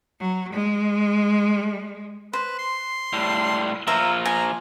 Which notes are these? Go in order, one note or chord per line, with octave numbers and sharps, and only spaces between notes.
F#3
G#3
B4 C5
C6
A2 G3
A#2 F3 E5 F5 A#5
G#5 A#5